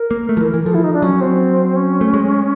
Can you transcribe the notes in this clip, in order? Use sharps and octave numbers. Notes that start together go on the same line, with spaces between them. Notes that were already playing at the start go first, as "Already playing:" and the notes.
Already playing: A#4
A#3
A3
F3
E3
E3
F3 A4
E4
D#4
D4
F#3 C#4
C4
C#4
A3
G#3